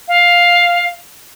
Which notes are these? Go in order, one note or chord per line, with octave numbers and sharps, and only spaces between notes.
F5